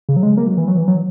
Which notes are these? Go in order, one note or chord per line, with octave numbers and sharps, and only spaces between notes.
C#3
F#3
G#3
A#3
F#3
E3
F#3
E3
F#3